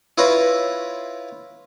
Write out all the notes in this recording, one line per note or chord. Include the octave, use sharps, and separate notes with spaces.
E4 F4 B4 C#5 A#5